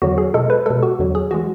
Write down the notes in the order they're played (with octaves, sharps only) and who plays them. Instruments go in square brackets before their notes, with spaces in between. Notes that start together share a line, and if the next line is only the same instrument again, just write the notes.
[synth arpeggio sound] E2 D3 F#3 F#4
G#4
B2 G#3 A4
B4
B2 G#3 A4
F#4
E2 D3 F#3
G#4
E3 G#3 F#4